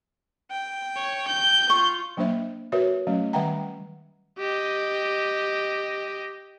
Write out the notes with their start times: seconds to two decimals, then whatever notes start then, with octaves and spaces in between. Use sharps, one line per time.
0.51 G5
0.96 C#5
1.28 G6
1.70 F4 C#6
2.17 F#3 A#3 D4 C5 E5
2.72 F#4 A#4 B4 C#5 E5
3.07 F#3 A3 C#4
3.33 D#3 G3 E5 F#5 G5 A#5
4.39 G4 D#5